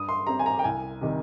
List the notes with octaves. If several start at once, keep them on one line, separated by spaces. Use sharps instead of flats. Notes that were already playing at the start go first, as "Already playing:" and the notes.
Already playing: G2 D#6
C6
G3 C4 A#5
G#5
A#5
G5
C2 G#5
C3 D#3 G3